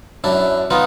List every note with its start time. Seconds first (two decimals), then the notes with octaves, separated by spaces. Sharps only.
0.24 F#2 D4 E4
0.70 B3 D#4 F4